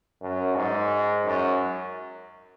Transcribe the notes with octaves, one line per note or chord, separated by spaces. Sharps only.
F#2
G#2
F#2